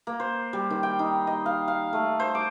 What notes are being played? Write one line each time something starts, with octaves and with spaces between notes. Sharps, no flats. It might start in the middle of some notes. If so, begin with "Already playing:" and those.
A#3
C5
G3
D#3
G5
D#4
D#5
F5
F5
A3
C5
D6